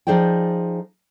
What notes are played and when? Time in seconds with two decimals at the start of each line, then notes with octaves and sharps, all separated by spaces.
0.07 F3 D#4 G#4 C5 D5 G5